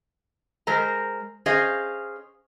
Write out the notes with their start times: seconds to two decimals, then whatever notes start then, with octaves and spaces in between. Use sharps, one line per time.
0.67 G#3 A#4 C5 A#5
1.46 C#4 G#4 C5 D#5 F5